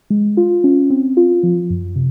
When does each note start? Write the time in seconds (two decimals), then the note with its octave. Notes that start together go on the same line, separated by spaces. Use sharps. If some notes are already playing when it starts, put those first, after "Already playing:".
0.10 G#3
0.37 F4
0.64 C#4
0.90 C4
1.17 F4
1.43 F3
1.70 F#2
1.96 C3